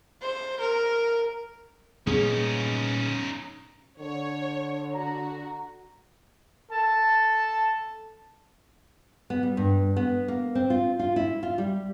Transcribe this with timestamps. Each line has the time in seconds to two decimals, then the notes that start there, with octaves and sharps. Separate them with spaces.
0.22 C5
0.60 A#4
2.07 A#2 G3 B3 C#4 D#4 G#4
3.99 D3 C#5
4.94 F#4 A#5
6.71 A4 A5
9.30 B3
9.43 G3
9.57 G2
9.96 B3
10.28 A#3
10.55 C4
10.70 F4
10.99 F4
11.16 E4
11.43 F4
11.58 G3